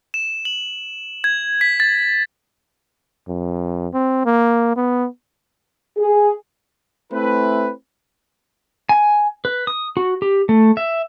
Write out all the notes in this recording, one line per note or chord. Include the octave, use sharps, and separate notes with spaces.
E7
F#7
G#6
B6
A6
F2
C4
A#3
B3
G#4
A3 C4 E4 B4
G#5
B4
D#6
F#4
G4
A3
E5